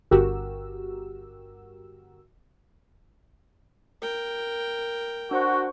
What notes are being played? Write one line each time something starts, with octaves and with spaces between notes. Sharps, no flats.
G1 F#4 G4 A#4 E6
A#4 G5
D4 F#4 C5 C#6